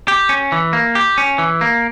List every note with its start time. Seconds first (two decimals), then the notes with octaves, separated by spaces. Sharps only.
0.08 G4
0.29 C#4
0.52 E3
0.73 A#3
0.95 G4
1.18 C#4
1.38 E3
1.61 A#3